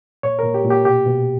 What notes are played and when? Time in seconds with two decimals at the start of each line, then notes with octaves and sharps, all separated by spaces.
0.23 A#2 C#5
0.39 A#2 A#4
0.54 G4
0.65 A#2
0.71 G4
0.85 B2 G4
1.06 B2